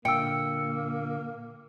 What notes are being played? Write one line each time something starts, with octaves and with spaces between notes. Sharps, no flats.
A#2 D3 A#3 G5 E6 C#7